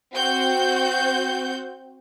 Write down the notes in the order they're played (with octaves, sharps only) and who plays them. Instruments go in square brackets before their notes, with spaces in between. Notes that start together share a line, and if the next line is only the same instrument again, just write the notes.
[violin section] C4 F#4 G6